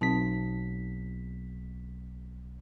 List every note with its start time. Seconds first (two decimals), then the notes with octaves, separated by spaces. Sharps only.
0.01 B1 C4 D#4 A5 B6